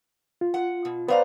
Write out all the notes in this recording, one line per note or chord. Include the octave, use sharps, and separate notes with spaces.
F4
F#5
B2
B3 B4 C5 D5 F5 A#5